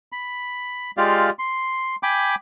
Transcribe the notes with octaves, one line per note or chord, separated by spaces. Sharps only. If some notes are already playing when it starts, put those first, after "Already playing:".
B5
G#3 F4 G4 D5 F5
C6
G5 G#5 B5 D6